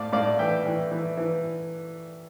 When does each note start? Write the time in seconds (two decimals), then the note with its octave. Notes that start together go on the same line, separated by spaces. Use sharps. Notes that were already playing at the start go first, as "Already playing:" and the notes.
Already playing: A2 D5 F5
0.12 A2 D5 F5
0.39 E3 E5 G5
0.65 E3
0.91 E3
1.17 E3